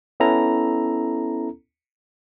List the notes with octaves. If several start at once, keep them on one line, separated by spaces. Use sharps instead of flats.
B3 C#4 E4 A4 A#5